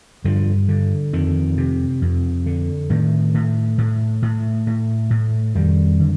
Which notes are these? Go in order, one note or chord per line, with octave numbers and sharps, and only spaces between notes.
G2 D3 F3
D3
F2 D#3
C3
F2
D3
A2 D#3
A2
A2
A2
A2
A2
F2 D#3 G3
D3